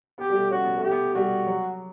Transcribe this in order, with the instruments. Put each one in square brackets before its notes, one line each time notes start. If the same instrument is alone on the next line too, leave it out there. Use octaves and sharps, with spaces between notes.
[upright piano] B3 [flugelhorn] G4
[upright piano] G3
A3
[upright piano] C#4 [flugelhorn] F#4
[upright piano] B3
A3
[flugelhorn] G4
[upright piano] B3
[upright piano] G3 [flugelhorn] F#4
[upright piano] F#3